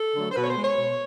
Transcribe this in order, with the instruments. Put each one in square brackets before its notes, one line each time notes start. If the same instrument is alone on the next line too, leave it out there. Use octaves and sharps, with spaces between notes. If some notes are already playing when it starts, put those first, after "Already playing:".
Already playing: [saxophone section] A4
D3 F#3 A3
C5
B2 B4
C#5
C5
G#3
C#5
B2